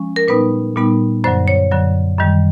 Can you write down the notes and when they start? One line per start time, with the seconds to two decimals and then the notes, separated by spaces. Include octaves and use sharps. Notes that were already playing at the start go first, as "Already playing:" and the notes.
Already playing: F3 G#3 C#4
0.16 A#4
0.28 A#2 G3 B3 D#4 B4
0.76 A#2 G3 B3 D#4
1.24 F#2 D3 F#3 C5
1.48 C#5
1.71 F#2 D3 F#3
2.18 F#2 D#3 G3